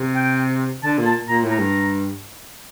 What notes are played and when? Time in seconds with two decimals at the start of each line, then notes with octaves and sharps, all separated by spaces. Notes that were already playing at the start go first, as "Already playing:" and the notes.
Already playing: C3
0.15 G5
0.84 D3 A5
0.99 A#2
1.06 A5
1.29 A#2 A#5
1.44 A2
1.52 A#5
1.59 G2